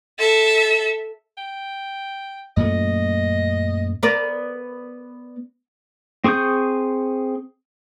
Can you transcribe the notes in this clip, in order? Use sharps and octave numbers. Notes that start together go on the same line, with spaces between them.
A4 E5
G5
F#2 A#2 A3 D#5
B3 A#4 D5
C4 G#4 C#6 D#6 G6